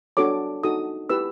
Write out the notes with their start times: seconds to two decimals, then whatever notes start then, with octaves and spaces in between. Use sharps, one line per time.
0.17 D4 F#4 A4 C#5 D6
0.63 D#4 F#4 A4 D#6
1.10 E4 G4 B4 E6